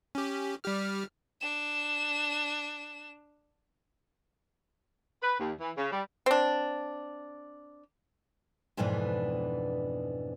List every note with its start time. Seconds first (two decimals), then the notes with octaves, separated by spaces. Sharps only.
0.15 C#4 G4
0.64 G3 G4 F6
1.41 D4 E7
5.22 B4
5.39 D#2
5.60 E3
5.77 C#3
5.92 G3
6.26 C4 D4
8.77 F2 G#2 B2 E3 B3 D4